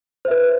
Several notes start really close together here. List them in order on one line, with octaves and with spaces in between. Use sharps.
C5 E5 B4